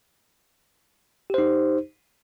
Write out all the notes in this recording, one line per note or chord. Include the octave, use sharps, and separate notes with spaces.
D#4 G4 C5